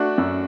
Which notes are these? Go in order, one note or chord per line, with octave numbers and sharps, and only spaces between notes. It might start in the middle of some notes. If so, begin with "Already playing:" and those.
Already playing: A3 D4 F#4
F#2